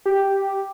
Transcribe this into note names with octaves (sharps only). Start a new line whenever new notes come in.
G4